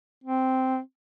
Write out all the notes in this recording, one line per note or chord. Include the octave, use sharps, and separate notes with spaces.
C4